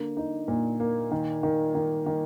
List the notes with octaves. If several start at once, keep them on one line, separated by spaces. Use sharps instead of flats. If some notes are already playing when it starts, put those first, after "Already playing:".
Already playing: D3 A#3
D#4
A#2
A#3
D#3
D#3
D#3
D#3